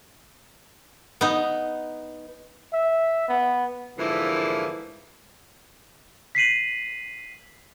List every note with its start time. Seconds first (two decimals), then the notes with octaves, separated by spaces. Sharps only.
1.21 B3 D#4
2.73 E5
3.29 B3
3.97 G#2 D3 E3 F3 A#3 E4
6.35 B6 C7 D#7 F#7